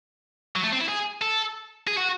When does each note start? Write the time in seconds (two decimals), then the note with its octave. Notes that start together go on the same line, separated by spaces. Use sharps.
0.56 F#3
0.64 A3
0.72 C4
0.80 E4
0.88 G#4
1.22 A4
1.87 G#4
1.98 F#4